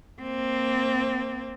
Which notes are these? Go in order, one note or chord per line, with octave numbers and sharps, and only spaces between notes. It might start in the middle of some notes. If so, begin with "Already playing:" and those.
A#3 C4